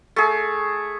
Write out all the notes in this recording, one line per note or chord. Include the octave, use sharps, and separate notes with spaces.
A3 G#4